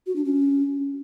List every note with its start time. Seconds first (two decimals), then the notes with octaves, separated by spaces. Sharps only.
0.07 F#4
0.16 D4
0.25 C#4